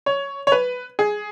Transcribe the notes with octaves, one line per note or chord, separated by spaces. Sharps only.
C#5
C#5
B4
G#4